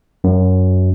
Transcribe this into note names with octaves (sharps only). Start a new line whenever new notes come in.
F#2